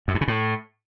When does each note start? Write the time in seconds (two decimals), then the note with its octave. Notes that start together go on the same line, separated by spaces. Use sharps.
0.08 F#2
0.14 G2
0.21 C#3
0.28 A2